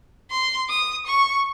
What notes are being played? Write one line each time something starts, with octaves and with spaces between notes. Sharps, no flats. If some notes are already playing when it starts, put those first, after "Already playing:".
C6
D#6
C#6